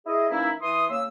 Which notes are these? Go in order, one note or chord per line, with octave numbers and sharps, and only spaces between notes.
E4 G#4 D#5
E3 A#3 C#4 D#4 E4
E3 C6 D#6
C#3 A#3 E6